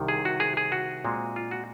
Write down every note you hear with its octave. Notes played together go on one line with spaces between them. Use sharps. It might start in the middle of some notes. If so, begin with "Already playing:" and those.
Already playing: C2 C3 D#3
G#4
F#4
G#4
G#4
F#4
A#2 G#3 C4
F4
F#4